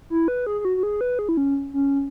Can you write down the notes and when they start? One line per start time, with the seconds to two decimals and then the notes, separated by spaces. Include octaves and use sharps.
0.10 E4
0.28 B4
0.46 G#4
0.60 G#4
0.65 F#4
0.77 F#4
0.83 G#4
1.01 B4
1.19 G#4
1.29 E4
1.37 C#4
1.73 C#4